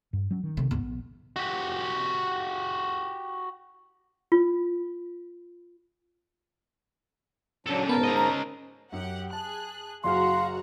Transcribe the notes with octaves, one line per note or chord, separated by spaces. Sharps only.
G2
F#3 C#4
D#3
C3 A3
D2 G#2 B3
A#1
F#4 G4
F4
C#3 F#3 D4 A4
G#2 B3 A#4 A5
C#4 D#5
A#5
F#2 G4 F#5
G#4 A5 F#6
F#1 F#4 G#4 F5 F#5 A#5 C6 F6